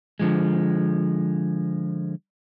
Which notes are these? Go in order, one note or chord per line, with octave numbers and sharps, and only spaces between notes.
D3 F3 G#3